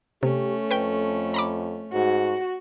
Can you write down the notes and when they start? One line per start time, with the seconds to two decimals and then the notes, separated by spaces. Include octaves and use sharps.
0.23 C3 A3 C#4 G4
0.71 F2 B4 G5
1.34 A#5 B5 D6
1.93 G#2 F#4